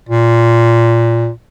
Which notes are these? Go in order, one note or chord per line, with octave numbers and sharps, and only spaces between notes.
A#2